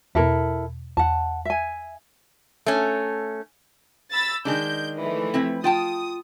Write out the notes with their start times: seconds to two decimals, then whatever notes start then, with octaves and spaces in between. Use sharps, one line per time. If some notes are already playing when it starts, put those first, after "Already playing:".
0.15 E2 B2 E4 A4 A#4
0.97 E2 F#5 A5
1.45 E5 G#5
2.66 A3 C#4
4.11 B5 E6 A6
4.45 D#3 G#3 D4 G6
4.99 E3 F3 A3
5.34 C4 E4 B4
5.64 F4 G5 A5 D#6